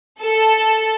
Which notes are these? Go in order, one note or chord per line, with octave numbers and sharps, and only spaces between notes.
A4